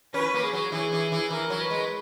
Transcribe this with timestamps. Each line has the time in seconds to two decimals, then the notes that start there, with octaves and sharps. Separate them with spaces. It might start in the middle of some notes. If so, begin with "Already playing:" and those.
0.14 C#4 B4
0.34 A#3
0.43 G#4
0.53 F#3
0.72 E3 G#4
0.92 E3
1.12 E3
1.31 E3 A#4
1.50 F#3
1.61 B4
1.70 G#3